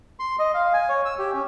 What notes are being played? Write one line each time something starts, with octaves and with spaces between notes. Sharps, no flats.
C6
D#5
F5
G#5
C#5
E6
G4
C#4